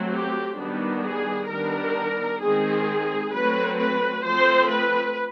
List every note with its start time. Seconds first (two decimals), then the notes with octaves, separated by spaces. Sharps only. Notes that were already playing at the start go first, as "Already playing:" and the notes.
Already playing: F#3 A3 C4
0.12 G4
0.58 D#3 G3 B3 D4
1.04 G#4
1.50 D#3 G3 B3 D4 A#4
2.41 D#3 G#3 C4 G#4
3.33 F#3 A3 C4 B4
3.79 B4
4.24 F3 A3 C4 C5
4.70 B4